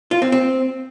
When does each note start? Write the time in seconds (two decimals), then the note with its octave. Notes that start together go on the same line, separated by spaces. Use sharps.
0.11 F4
0.22 C4
0.32 C4